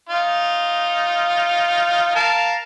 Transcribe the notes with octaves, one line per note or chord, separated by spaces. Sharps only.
D#4 F4
A#4 F5 A5